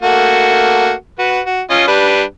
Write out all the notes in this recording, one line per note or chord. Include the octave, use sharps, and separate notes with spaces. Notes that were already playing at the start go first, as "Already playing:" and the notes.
A3 A#3 F#4
F#4 B4
F#4
C#4 F4 D#5
G3 D4 B4